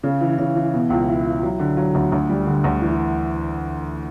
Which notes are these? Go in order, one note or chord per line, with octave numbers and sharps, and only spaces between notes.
C#3
E3
C#3
E3
B2
C#2
E4
E4
F#3
D3
F#3
D2
D2
G3
D3
D2
E3